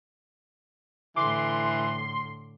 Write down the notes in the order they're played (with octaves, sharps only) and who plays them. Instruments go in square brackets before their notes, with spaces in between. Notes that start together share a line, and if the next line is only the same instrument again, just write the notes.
[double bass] A2 D3 [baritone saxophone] E3 [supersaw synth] C6 [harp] D6